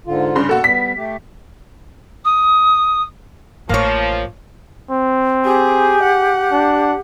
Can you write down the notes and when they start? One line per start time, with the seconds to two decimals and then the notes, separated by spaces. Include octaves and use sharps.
0.07 G#2 D3 F4
0.35 G2 C#3 C6
0.49 B2 A#3 F#4 A4
0.64 G3 B3 B6
0.97 A3 G4
2.25 D#6
3.69 A1 A2 F3 A#3 C#5
4.90 C4
5.45 G4 G#4
6.03 F#5
6.52 D4